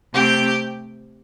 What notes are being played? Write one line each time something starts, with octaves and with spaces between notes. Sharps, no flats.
C3 A3 C4 G4 G5